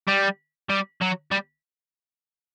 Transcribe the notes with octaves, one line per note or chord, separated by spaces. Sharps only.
G3
G3
F#3
G3